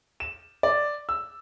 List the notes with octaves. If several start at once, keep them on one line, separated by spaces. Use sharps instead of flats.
E7
D5
E6